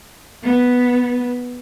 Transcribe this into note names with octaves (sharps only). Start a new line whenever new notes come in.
B3